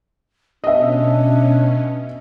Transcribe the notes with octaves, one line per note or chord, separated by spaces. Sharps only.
B2 C#4 D4 D#5 E5